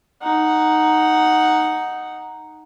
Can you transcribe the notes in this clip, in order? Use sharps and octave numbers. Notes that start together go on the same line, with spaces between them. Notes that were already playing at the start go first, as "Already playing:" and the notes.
D#4 F#5